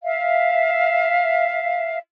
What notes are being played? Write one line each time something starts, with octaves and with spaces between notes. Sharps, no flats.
E5 F5